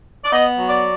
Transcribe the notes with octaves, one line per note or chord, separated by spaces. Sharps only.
D5
B3 D#5
F#3
D5